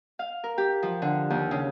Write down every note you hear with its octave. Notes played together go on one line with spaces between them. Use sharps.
F5
A#4
G4
F3
D3
D#2
C#3